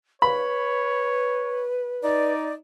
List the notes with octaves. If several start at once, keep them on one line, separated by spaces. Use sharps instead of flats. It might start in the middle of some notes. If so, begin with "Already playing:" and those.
B4 C#5 B5
D#4 D5